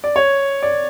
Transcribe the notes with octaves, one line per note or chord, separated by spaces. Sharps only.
D5
C#5
D5